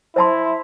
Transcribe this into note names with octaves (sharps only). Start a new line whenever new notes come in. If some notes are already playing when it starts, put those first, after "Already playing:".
E4 C5 E5 A5 C6